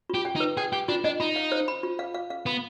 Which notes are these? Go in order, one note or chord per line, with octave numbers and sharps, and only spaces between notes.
F4 G4
G5
D#4
B4
G#4 G5
G4 G5
D4 F4
D4 D#5
D#4 B5
F5
C5
B5
F4
F5
F5
F5
B3 B5